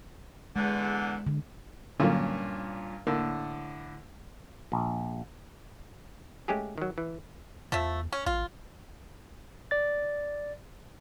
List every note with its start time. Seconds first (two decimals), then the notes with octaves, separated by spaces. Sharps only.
0.56 E2 D3 G#3
1.27 D3
2.00 G2 A#2 D3 F#3 A#3 C#4
3.07 A2 D3 A#3
4.72 A#1
6.48 G#3 A3 C#4 G4 G#4
6.78 D#3 F#3
6.98 E3
7.72 E2 F3 A3 E5
8.12 C#4
8.26 A1 F4
9.71 D5 A6